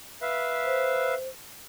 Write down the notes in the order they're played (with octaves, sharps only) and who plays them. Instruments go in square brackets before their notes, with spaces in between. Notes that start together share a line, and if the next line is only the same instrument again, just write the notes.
[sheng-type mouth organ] B4 E5 F5
[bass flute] C5